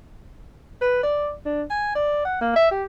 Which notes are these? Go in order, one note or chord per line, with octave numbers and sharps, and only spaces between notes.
B4
D5
D4
G#5
D5
F#5
A#3
E5
G4